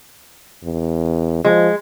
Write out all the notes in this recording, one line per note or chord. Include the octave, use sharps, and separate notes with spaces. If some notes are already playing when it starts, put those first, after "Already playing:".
E2
F3 G#3